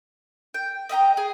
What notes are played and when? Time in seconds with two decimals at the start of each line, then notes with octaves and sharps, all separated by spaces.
0.54 G5
0.89 D#5 E5 G5 A#5
1.17 G#4